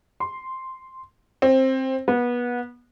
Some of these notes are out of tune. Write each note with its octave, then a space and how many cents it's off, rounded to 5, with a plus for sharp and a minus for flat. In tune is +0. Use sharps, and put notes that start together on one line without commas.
C6 -5
C4 +15
B3 -25